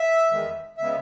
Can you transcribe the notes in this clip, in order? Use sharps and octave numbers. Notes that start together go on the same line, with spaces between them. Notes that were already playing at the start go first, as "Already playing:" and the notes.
Already playing: E5
E2 D#3 G#3 B3
C#3 G#3 B3 E5